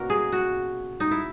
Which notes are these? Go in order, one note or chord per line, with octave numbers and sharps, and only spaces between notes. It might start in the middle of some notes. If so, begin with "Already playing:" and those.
Already playing: B2 A#3 C#4 F#4 A#4
G#4
F#4
D#4
E4